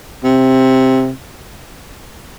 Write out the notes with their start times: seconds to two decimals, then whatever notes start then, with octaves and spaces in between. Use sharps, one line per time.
0.24 C3